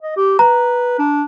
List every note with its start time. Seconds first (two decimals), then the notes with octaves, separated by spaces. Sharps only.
0.02 D#5
0.17 G4
0.39 B4 A#5
0.99 D4